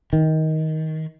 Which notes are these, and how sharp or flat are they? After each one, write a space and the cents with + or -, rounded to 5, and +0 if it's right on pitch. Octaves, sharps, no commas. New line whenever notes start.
D#3 +20